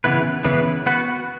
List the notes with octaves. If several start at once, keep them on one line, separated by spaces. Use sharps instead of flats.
C#3 E3 B3 E4 B4
C#3 E3 B3 E4 B4
B3 F#4 B4